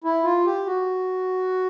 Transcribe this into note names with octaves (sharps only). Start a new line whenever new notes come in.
E4
F4
G4
F#4